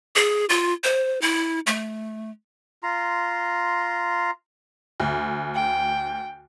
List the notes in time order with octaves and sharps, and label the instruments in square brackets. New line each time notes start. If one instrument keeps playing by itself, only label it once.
[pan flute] G#4
F4
C5
E4
A3
[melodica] F4 A#5 C6
[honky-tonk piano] D2
[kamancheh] G5